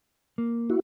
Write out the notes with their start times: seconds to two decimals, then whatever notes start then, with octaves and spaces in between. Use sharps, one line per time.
0.38 A#3
0.70 E4 F#4